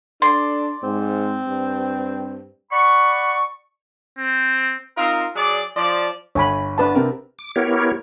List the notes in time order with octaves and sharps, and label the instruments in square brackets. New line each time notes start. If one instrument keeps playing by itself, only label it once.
[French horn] D4 [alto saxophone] A4 [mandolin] D5 C6
[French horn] G#2 [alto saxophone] C4
[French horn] G2
[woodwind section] D5 F#5 B5 C#6
[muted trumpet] C4
[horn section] C4 D#4 F4 A#4
F#3 G#4 D5
F3 D5
[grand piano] G1 [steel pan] C#5 G#5 B5
[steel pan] D4 B4 A5
[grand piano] C3 C4 A#4
[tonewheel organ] D6
B3 E4 G4 A#4 C#5